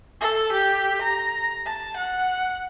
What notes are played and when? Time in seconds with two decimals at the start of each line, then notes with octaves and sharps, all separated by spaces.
0.21 A4
0.53 G4
1.02 A#5
1.66 A5
1.97 F#5